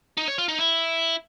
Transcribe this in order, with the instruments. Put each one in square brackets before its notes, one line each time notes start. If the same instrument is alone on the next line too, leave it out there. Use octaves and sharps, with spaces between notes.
[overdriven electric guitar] D#4
C#5
F4
D#4
E4